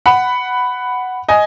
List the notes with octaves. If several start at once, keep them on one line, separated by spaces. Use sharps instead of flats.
F#5 B5
D#5 G#5